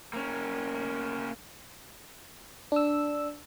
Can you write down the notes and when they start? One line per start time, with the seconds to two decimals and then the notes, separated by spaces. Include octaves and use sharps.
0.13 A#3 C#4
2.72 D4 E6